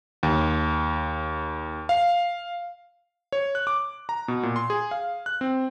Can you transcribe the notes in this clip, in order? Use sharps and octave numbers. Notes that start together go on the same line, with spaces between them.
D#2
F5
C#5
F#6
D6
A#5
B2
A#2
C6
G#4
F5
F#6
C4